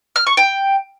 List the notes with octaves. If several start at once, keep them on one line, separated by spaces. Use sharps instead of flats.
F6
C#6
G5